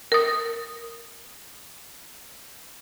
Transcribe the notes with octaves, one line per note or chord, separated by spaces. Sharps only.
A#4 D#6